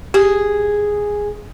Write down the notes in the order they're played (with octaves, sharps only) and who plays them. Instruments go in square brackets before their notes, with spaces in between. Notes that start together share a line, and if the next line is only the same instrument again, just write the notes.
[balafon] G4 [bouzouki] G#4